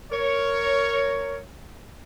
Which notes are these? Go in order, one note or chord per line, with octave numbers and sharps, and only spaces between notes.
A#4 C#5